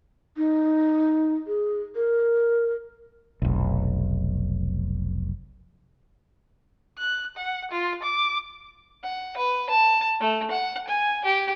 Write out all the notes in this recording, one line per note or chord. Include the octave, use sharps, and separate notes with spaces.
D#4
G#4
A#4
F1 B1
F#6
F#5
F4
D6
F#5
B4
A5
A3
F#5
G#5
G4